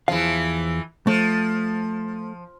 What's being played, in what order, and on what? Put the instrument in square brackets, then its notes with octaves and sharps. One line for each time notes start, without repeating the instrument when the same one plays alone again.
[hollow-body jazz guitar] E2 F5 [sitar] E3 F3
[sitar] F3 [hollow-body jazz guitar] A3